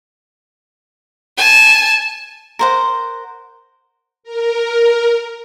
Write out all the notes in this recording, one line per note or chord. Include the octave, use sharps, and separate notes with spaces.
G#5 A5
A#4 C5 F#5
A#4